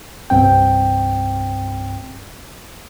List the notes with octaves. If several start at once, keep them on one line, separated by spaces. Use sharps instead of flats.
C2 G2 C4 G5